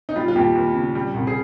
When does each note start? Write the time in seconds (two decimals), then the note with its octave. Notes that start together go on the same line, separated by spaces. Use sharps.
0.09 D#4
0.16 G3 F4
0.28 F4
0.35 D#2 G4
0.55 D#2
0.75 C#3
0.95 G3
1.14 C2
1.27 G#4